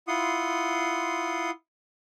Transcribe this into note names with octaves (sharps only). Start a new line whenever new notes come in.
E4 F4 F#5 C6 D#6